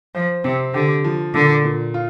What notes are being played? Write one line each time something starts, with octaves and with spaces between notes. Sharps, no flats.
F3 C5
C3 C4
D3 G4
F3
A#2 D3
A#2
F4